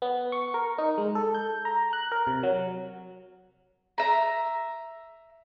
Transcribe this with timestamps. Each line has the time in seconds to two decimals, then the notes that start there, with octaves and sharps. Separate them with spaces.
0.02 B3
0.32 C#6
0.54 A#4
0.78 D#4
0.98 G#3
1.15 A4
1.34 G6
1.65 A#5
1.93 F#6
2.12 A#4
2.27 C3
2.43 F#3
3.98 E5 A#5